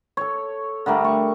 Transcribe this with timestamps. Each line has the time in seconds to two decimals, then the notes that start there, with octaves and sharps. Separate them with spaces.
0.17 A4 C#5
0.86 D3 G3 A3 A#4
1.04 C#6